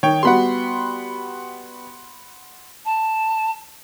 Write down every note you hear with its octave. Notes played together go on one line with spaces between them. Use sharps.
D#3 C#5 G5
G3 B3 F#4 F#5 B5 C6
A5